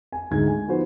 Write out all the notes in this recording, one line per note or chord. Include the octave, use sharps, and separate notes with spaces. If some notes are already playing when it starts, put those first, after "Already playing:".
G#5
D2 G#2 G#6
G#5
F3 B3 D#4 F#4 C5